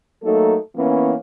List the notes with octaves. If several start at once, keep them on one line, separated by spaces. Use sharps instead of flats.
F#3 A3 A#3 D#4 A4
E3 A#3 B3 C#4